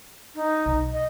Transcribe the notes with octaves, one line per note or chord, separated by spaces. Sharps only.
D#4
B1
D#5